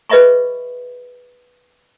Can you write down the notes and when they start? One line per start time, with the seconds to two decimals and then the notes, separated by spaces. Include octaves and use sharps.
0.10 G#4 B4 D#5 E5 B5 C#6